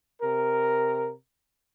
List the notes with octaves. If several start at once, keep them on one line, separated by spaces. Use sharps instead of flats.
C3 A#4